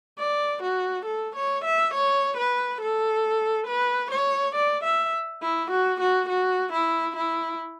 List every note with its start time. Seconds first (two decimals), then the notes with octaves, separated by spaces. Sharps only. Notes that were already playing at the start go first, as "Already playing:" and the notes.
0.18 D5
0.63 F#4
1.06 A4
1.35 C#5
1.65 E5
1.94 C#5
2.37 B4
2.81 A4
3.67 B4
4.11 C#5
4.55 D5
4.84 E5
5.42 E4
5.71 F#4
6.00 F#4
6.29 F#4
6.72 E4
7.16 E4